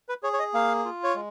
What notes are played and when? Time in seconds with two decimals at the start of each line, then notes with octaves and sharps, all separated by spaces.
0.09 B4
0.23 G#4 C#5
0.33 C#5
0.39 D#5
0.54 A#3 F5
0.85 F4
1.04 C#5
1.15 G#3